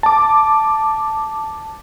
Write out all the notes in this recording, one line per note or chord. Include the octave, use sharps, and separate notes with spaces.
A5 D6